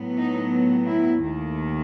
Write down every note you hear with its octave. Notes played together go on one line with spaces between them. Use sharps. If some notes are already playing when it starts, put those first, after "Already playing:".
Already playing: A2 F#3 B3
D#4
E4
D#2 D#3 A3